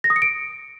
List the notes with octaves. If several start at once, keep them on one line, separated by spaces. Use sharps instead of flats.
A#6
D#6
C#7
D7